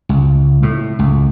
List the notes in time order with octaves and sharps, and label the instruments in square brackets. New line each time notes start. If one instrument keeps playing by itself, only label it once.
[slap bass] C#2
A2
C#2